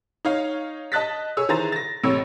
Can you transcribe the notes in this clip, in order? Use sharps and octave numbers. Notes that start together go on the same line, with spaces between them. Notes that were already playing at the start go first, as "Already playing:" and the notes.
D#4 C#5 F5
D#5 A5 F#6 A6 B6
G#4 C#5 E6
D#3 E3 G#4 C5 A#5 A6
A6 A#6
A1 A2 C3 C#5 E6